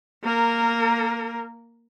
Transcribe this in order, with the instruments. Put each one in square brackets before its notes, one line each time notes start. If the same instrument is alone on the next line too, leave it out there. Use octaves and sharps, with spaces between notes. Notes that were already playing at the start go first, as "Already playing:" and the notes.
[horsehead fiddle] A#3 A#4